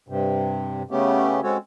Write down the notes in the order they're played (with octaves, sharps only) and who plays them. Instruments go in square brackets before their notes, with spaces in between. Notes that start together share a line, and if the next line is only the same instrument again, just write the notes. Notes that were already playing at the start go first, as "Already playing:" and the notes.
[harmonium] G2 C3
C#3 A3 B3 C#4 G4
G#3 C4 C#4 F#4 A4 C#5